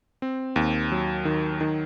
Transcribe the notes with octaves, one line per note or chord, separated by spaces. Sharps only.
C4
D#2
F#3
D#3
D#3